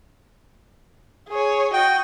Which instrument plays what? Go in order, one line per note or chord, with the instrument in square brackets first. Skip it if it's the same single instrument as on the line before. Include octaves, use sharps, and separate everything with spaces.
[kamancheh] G#4 C#5
[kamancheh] F#4 D#5 [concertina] G5